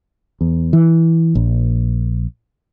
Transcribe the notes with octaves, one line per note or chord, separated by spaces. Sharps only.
E2
E3
A#1